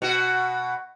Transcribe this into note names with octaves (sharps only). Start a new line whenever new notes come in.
B2 F#4